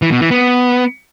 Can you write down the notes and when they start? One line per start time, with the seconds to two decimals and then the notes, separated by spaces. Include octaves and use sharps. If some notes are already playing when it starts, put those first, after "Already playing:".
0.02 E3
0.12 B2
0.21 E3
0.31 B3